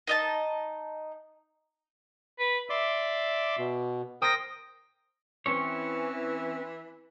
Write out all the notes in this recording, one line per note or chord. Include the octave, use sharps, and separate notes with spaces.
D#4 D#5 A5
B4
D5 E5 C6 D6
B2
A#4 C5 G5 D#6 A#6
E3 C4 C#4 C#5